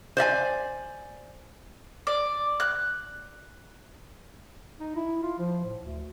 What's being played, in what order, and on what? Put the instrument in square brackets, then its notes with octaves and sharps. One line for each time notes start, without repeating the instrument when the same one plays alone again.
[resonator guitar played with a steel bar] C5 D5 E5 G#5
[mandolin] D5
F#6
[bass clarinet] D#4
E4
F4
F3
A2
D2